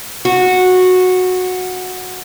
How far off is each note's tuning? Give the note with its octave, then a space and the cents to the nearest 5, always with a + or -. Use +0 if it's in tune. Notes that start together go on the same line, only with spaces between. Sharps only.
F#4 -10